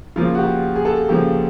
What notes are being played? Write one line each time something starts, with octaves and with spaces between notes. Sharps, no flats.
C#3 F3 A#3 F4
F#4
G4
G#4
A4
C#3 F3 A#3 G4